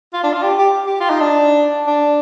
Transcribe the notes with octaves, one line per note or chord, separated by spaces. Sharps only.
F4
D4
F4
G4
G4
G4
F4
D#4
D4
D4